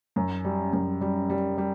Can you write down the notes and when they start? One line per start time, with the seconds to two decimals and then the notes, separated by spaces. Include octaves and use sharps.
0.16 F#2
0.45 G3
0.73 F#2
1.01 G3
1.30 G3
1.58 G3